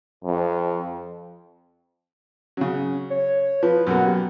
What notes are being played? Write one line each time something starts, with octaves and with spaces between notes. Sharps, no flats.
F2
C#3 F#3 C#4
C#5
F3 B4
F#2 B2 A#3 F#5
G4